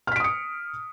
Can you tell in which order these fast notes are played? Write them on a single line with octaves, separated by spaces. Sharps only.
F6 B6 D7 D#6 C#7